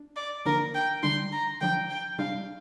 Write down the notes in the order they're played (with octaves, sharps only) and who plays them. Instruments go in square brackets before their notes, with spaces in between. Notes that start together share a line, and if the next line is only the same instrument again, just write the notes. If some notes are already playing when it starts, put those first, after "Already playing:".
Already playing: [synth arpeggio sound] D4
[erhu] D5
[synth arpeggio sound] D3 F3 A#3 D4 [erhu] A#4
[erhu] G5
[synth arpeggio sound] D3 G3 D4 [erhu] C6
[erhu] A#5
[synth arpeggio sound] D3 F3 D4 [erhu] G5
[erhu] G5
[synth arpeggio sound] C3 G3 D4 [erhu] F5